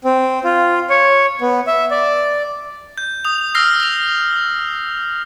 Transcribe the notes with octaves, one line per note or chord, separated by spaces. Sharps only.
C4
F4
C#5
B3
E5
D5
G6
D#6 F7
E6 F6 A#6 C7
A#6 F7